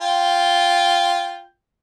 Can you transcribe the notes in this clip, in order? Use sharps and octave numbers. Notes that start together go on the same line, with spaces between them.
F4 G5